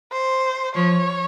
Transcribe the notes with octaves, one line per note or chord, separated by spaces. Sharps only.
C5
F3 C#5